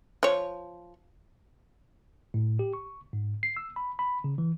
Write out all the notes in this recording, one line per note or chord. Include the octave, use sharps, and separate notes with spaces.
F3 C#5
A2
G4
C#6
G#2
C7
E6
B5
B5
C#3
E3